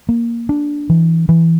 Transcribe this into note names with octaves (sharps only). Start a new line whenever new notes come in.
A#3
D4
E3
E3